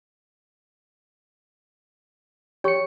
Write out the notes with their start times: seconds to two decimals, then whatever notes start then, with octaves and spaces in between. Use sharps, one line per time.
2.64 G4 C#5 C#6 C#7